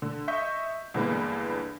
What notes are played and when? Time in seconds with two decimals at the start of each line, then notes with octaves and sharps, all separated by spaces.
0.02 D3
0.28 D#5 E5 C#6 G6 B6
0.94 E2 G2 D3 G#3 A#3 B3